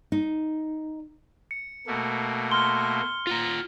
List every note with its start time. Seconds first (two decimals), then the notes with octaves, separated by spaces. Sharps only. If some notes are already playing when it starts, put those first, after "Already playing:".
0.12 D#4
1.51 C#7
1.87 B2 A3 A#3
2.51 C6 F6 G7
3.27 F4 F#5 A#5